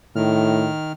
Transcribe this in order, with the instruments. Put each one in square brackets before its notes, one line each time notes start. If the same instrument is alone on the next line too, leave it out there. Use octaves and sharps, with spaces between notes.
[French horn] A2 [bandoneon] D#3 F6